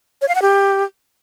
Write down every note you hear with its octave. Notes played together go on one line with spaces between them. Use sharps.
C#5
F5
F#5
G4